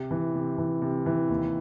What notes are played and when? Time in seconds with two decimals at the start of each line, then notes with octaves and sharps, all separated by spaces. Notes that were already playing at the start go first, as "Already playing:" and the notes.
Already playing: C3
0.11 E3
0.35 C3
0.58 E3
0.82 C3
1.06 E3
1.30 D#2